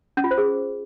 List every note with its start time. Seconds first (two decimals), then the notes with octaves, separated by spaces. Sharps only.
0.17 C#4
0.24 F4
0.31 C5
0.38 G#4